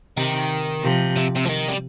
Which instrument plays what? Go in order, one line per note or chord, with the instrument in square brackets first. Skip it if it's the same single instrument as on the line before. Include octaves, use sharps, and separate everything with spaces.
[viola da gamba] C3 [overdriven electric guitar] D#3
[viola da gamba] C3 F3
[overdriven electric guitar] C3
C3
F3
D#3
G3